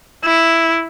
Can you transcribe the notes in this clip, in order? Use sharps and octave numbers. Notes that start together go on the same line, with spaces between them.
E4